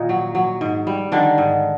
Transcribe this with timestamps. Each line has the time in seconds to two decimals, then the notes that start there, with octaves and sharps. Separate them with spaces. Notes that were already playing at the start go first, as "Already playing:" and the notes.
Already playing: A#2 D#3 D#4
0.09 F#3
0.35 F#3
0.61 G#2
0.87 G3
1.12 D3 D#3 D4
1.38 G#2